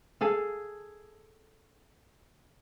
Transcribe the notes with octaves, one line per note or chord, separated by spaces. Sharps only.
G#4 A4 F5